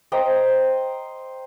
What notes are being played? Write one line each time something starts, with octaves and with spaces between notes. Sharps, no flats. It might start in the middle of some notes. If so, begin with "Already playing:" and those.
C5 D#5 G5 A#5